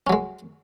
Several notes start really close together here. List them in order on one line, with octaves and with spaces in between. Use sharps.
C#4 F#3 G#3